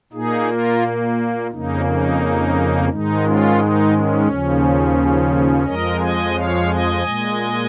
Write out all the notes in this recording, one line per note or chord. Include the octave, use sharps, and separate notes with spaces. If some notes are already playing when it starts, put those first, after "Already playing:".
A#2 A#3 D#4 G#4
F4 A#4
F2 C#3 A#3 D#4
D#4
G#2 D#3 G#3 D#4
C#4 F4
D#4
C#4
D#2 C#3 F3
F2 F3 G#3 A#4 D#5
D#5 G#5
C#5 F5
D#5 G#5
A#2 G#3